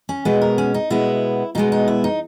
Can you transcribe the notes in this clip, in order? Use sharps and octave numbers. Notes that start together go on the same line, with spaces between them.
C#4
B2 G#3 B3 B4
A#4
C#4
D#4
B2 G#3 B3 E4
B2 G#3 B3 D#4
D#4
E4
D#4